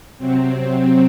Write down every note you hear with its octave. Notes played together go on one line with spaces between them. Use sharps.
C3 F#3 C4